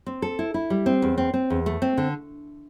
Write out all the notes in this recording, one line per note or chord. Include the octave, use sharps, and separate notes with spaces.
C4
A4
E4
E4
G3
C4
E2
C4
C4
E2
A3
C4
D3